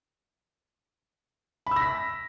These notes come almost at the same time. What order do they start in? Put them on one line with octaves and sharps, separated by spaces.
B5 E6 A#6 B6